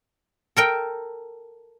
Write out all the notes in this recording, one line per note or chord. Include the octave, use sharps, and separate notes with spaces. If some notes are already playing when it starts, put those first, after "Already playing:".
A4 A#4 G5